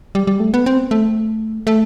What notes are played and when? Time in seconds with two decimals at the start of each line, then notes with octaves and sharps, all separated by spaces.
0.15 G3
0.27 G3
0.40 A3
0.54 B3
0.66 C4
0.91 A3
1.67 A3